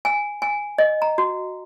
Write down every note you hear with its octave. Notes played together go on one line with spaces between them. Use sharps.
G#5
G#5
D#5
A#5
F#4